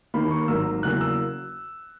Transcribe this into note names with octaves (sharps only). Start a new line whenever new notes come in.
D#2 D#3 A#3 B5
C#6
G#1 G#2 F#3 A#3 E6
E2 C#3 F#3 A#3 F#6
E6